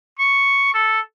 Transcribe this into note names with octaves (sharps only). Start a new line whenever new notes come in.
C#6
A4